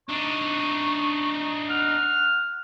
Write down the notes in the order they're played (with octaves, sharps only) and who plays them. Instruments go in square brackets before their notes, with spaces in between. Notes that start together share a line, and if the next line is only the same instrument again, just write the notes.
[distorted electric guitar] D4 D#4 [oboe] C#6
[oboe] F#5 [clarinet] F6